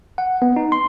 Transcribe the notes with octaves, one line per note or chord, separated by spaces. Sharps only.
F#5
B3
D#4
C6